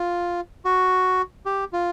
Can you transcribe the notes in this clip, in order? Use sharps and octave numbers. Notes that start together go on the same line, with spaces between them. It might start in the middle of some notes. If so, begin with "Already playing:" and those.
Already playing: F4
F#4
G4
F4